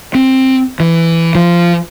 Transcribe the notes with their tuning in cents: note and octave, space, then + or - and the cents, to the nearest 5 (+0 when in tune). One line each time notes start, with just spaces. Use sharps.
C4 +10
E3 +10
F3 -15